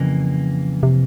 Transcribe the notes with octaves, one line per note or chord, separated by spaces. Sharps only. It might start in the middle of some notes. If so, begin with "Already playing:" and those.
Already playing: F2 C#3 E3 A#3
C3